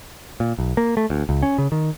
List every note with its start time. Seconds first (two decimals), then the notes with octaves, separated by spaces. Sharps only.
0.40 A#2
0.58 B1
0.77 A#3
0.97 A3
1.10 D2
1.29 C#2
1.43 C#4
1.58 C#3
1.72 D#3